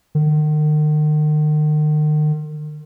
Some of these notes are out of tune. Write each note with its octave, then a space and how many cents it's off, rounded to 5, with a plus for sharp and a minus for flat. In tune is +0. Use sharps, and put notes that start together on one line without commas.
D#3 -40